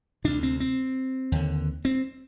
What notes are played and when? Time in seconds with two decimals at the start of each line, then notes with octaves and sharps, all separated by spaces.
0.24 D2 C3 D4
0.43 C4
0.60 C4
1.32 D#2 D3
1.85 C4